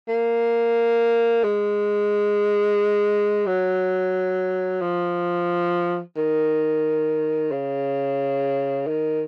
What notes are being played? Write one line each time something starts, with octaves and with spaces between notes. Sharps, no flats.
A#3
G#3
F#3
F3
D#3
C#3
D#3